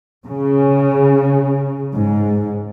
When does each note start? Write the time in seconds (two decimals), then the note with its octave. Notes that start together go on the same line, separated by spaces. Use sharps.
0.24 C#3
1.94 G#2